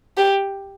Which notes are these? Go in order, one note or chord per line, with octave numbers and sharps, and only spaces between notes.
G4